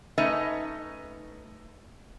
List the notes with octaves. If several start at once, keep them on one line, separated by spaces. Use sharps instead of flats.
A3 C#4 D#4 B4 D#5